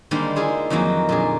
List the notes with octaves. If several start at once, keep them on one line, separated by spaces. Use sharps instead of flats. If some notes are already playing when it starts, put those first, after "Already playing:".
D3 D#3 G3 G#3 A#3 C5
E4 F4 G#4 C5
F2 D#3 E3 F#3 A#3
A#2 D3 G#4